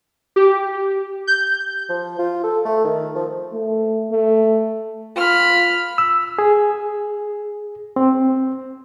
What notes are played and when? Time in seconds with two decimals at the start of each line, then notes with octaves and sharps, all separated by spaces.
0.36 G4
1.27 G6
1.89 F3
2.19 F4
2.43 A4
2.65 A3
2.84 D#3
3.15 F3
3.53 A3
4.12 A3
5.17 F4 B5 F6
5.98 E6
6.39 G#4
7.96 C4